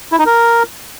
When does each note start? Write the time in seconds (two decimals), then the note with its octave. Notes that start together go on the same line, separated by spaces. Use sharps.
0.12 E4
0.19 D#4
0.26 A#4